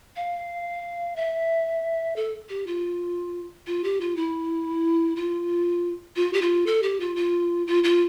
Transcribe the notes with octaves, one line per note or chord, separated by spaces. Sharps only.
F5
E5
A4
G4
F4
F4
G4
F4
E4
F4
F4
G4
F4
A4
G4
F4
F4
F4
F4